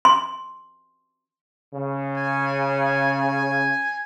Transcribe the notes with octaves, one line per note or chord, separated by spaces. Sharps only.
C6
C#3
G#5